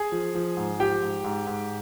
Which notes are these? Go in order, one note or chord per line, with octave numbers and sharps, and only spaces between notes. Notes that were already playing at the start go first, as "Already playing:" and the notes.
Already playing: G#4 G#5
F3
F3
G#2
F3 G4 G5
G#2
G#2
G#2